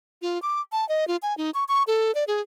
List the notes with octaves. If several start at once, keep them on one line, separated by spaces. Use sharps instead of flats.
F4
D6
A5
D#5
F4
G#5
D#4
C#6
C#6
A4
D5
G#4